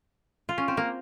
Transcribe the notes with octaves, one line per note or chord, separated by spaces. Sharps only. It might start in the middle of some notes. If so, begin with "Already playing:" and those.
F4
C#4
C4
A#3